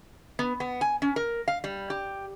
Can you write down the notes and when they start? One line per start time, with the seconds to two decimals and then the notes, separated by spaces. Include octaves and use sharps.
0.39 B3
0.60 B3
0.81 G#5
1.02 C#4
1.16 A#4
1.48 F5
1.64 G3
1.90 G4